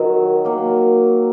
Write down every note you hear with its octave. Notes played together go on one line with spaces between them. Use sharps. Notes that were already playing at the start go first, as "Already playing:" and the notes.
Already playing: D#3 F#3
F#3 A#3